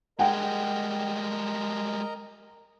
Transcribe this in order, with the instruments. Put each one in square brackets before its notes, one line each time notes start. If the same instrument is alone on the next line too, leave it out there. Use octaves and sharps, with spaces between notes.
[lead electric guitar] G3 G#3 [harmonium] A#4 D#5 A#5 [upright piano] F#5 G5